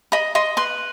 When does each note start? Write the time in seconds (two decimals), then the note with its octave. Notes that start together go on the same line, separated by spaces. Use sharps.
0.12 D#5 B5
0.35 D#5 C6
0.57 B4 C6